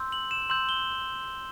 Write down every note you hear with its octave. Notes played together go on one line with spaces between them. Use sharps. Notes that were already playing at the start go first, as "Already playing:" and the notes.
Already playing: C6 E6 G6
F#7
E7
C6 E6 G6 F#7
G7